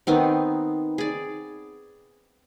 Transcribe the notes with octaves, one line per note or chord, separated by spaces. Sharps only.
D#3 B3 C4 D#4
G#4 D5